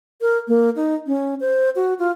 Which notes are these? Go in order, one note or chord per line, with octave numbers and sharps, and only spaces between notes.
A#4
A#3
D#4
C#4
C5
F#4
F4